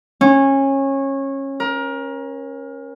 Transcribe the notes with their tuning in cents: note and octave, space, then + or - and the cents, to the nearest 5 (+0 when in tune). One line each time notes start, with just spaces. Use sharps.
C#4 -25
A#4 +25